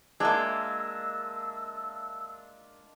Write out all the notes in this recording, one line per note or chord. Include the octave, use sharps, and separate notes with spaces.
G#3 A#3 D4 F4 E5 E6